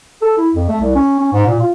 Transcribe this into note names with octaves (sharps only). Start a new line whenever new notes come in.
A4
E4
F2
A3
C2
C#4
C#4
G#2
A#2
F4